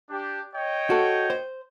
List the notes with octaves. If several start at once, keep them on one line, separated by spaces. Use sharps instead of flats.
D4 G4
C#5 D#5 G5
F#4 A4
C5